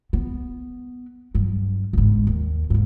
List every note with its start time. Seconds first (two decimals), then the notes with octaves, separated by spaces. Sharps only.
0.13 B3
1.35 G2 F#3
1.93 G1 G#2
2.27 D#2
2.70 F2 G#2